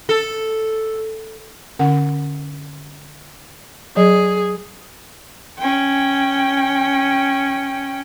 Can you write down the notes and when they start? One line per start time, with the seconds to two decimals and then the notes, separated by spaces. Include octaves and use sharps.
0.09 A4
1.79 D3 C#4 F#5
3.96 F#3 G#4 D#5
5.58 C#4 G5